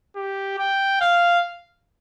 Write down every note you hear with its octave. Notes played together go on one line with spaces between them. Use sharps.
G4
G5
F5